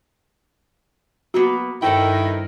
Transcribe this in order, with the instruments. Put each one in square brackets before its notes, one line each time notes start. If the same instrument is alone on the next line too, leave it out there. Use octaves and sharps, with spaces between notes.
[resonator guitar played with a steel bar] F#3 A#3 B3 [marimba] F#4
[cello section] G2 D#4 A#4 [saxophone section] D#3 E4 [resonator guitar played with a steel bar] A4 C5 G5